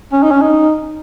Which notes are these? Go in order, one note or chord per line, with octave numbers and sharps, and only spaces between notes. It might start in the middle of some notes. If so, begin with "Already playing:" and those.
C#4
D#4
C#4
D#4